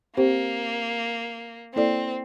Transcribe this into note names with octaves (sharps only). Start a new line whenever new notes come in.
A#3 C4 G4 C5
A#3 C4 E4 A4 D5